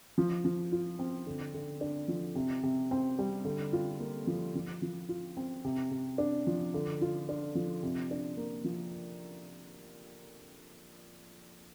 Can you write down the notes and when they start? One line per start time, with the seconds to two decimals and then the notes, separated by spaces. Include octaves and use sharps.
0.18 F3
0.45 F3
0.72 F4
0.99 C4
1.27 D3
1.54 D3
1.81 D4
2.08 F3
2.35 C3
2.63 C3
2.91 C4
3.19 G3
3.45 D3
3.73 F4
4.00 A#3
4.27 F3
4.55 F3
4.82 F3
5.09 F4
5.37 C4
5.64 C3
5.91 C3
6.18 D4
6.47 F3
6.74 D3
7.02 F4
7.29 D4
7.55 F3
7.83 C3
8.11 D4
8.37 A#3
8.64 F3